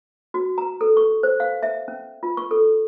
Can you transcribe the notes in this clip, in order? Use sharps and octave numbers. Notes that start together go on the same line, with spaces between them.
F#4
A#5
A4
C#6
C5
F5
E5
C#4
F4
C#6
A4